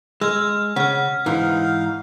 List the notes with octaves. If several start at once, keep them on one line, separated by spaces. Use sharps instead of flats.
G#3 E6 F6
C#3 F#5 F6
G#2 E3 D#4 F5